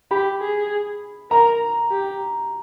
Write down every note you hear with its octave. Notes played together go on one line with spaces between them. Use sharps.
G4 B5
G#4
A#4 A#5
G4